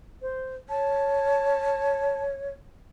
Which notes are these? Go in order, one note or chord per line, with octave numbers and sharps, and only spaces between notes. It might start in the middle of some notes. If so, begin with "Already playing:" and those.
C5
C#5 A5